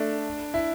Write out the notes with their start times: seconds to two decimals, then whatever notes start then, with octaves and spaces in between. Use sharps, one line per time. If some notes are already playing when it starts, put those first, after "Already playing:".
Already playing: A3 D4
0.54 E4